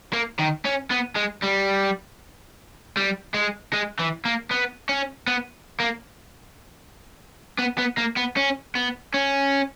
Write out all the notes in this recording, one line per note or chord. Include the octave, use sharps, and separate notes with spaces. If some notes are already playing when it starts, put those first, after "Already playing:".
A#3
D#3
C#4
B3
G#3
G3
G3
G#3
G#3
E3
A#3
B3
C#4
B3
A#3
B3
B3
A#3
B3
C#4
B3
C#4